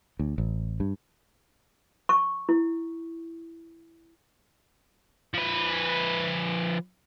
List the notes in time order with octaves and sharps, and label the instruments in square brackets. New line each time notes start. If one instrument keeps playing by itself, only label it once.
[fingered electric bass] D2
A1
G2
[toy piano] C#6
E4
[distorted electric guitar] F3 B4